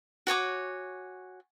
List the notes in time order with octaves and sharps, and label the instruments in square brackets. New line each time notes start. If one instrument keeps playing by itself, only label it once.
[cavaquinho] F#4 C#5 G#5 D6